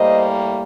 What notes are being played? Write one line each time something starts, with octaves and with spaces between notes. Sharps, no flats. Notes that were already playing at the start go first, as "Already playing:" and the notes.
Already playing: A2 G3 A#3 C5 D#5